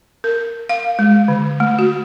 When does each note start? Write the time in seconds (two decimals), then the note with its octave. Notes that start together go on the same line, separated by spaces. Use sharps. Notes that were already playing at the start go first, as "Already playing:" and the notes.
0.24 A#4
0.69 F5
0.99 G#3
1.28 D3
1.60 A3
1.79 F#4